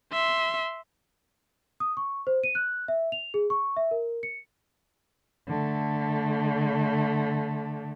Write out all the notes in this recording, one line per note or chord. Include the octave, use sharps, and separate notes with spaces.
E5 C6
D#6
C#6
C5
D#7
F#6
E5
F7
G#4
C#6
E5
A#4
C#7
D3 A3